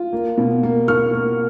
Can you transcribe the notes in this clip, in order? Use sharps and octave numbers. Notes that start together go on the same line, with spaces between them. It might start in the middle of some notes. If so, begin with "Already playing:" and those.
Already playing: F4
A#3
B2
A#3
A#3 C#6 F6
A#3